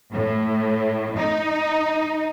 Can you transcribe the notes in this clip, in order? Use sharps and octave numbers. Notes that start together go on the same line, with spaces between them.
A2
D#4